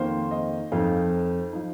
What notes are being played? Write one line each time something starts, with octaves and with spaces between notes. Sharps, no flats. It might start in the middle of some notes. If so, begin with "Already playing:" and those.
Already playing: F2 D#3 A#3 C5
D#5
F2 F3 D#4 F5
F3 D#4